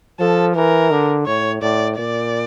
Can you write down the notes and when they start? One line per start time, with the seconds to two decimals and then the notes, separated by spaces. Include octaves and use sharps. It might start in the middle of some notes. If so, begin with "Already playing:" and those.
0.20 F3 A4
0.55 E3 A#4
0.91 D3
1.26 A2 C#5
1.61 A2 D5
1.98 A#2 D5